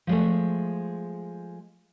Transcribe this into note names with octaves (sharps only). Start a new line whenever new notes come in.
F3 G#3 A3